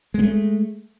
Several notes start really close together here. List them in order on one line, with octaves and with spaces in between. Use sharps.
G#3 B3 A3